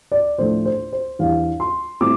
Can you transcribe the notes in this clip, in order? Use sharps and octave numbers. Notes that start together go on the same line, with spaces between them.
D5
A2 F3 A3 D4 C5
C5
C5
E2 E3 G3 D4 F5
C6
A2 G3 C4 E4 D6